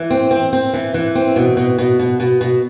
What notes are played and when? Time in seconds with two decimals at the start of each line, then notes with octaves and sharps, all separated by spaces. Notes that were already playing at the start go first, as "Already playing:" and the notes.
Already playing: E3
0.10 C4
0.31 C4
0.53 C4
0.73 E3
0.94 E3
1.15 C4
1.36 B2
1.57 B2
1.78 B2
1.99 B2
2.20 B2
2.41 B2